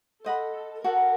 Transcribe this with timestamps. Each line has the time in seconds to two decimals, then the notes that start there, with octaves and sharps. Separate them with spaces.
0.24 A4 C5 D#5 F#5 B5
0.84 F#4 A4 A#4 D5 F#5